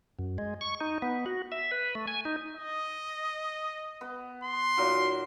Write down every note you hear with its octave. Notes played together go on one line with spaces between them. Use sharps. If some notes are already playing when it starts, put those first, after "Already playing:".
F#2
G#3
C#6
D#4
B3
F#4
E5
B4
A3
G#5
D#4
D#5
B3
C6
A#2 D#3 F#3